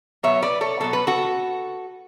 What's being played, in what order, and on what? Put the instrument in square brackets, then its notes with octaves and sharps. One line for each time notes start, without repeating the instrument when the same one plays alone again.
[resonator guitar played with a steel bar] B2 F#3 B3 C#5 E5
B4 D5
A4 C#5
B2 F#3 B3 A4
B4
F#4 A4